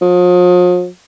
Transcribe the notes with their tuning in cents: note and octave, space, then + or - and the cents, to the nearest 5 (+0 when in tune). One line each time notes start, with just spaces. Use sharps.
F3 +40